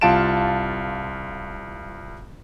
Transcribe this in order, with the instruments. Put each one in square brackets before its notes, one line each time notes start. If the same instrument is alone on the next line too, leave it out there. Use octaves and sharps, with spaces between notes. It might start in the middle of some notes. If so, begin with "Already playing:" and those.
[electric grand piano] C2 F4 F5 A5 D7 E7